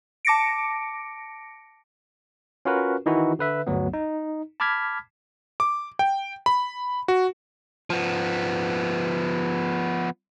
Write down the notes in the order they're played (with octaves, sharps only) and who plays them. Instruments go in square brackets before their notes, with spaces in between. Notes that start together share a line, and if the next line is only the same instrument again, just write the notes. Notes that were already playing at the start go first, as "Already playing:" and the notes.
[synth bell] A5 D6 A#6 C#7 D7
[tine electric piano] C#4 F4 F#4 A#4 B4
D#3 E3 D#4 E4 F#4
D3 B4 E5
G1 D2 F#3 B3
D#4
A5 B5 D6 F6 G#6 B6
[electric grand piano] D6
G5
B5
F#4
[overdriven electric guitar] F3 B3